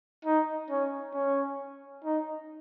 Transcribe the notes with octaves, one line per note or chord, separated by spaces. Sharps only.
D#4
C#4
C#4
D#4